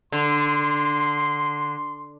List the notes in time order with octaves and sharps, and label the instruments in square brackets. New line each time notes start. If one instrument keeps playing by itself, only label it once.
[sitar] D3 [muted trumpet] C6